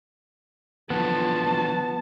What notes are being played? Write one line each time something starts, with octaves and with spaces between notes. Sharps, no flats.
D3 E3 F3 B3 A5